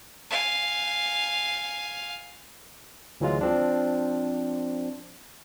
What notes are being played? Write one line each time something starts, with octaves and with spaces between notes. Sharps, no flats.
F5 G#5
D2 E3 F#3 G#3 F4
F3 C4 D4